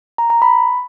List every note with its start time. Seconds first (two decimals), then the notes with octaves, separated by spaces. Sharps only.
0.18 A#5
0.30 A#5
0.42 B5